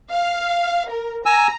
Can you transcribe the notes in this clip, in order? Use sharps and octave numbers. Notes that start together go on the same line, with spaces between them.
F5
A#4
G#5 A#5 E6